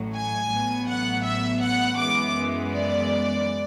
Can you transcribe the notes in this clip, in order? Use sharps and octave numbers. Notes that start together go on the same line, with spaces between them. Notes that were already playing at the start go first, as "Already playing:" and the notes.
Already playing: A1 A2 F#3
G#5
A1 A2 F#3 B3
F#5
E5
F#5
F#2 E3 G#3 B3 D6
D5